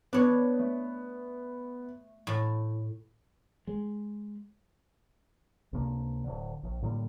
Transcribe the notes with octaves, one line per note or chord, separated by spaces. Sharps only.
B3 D4 C#5
A3
A2
G#3
C#2 C3 A#3 D4
D1 D3
A#1
A2 D3 G3 A#3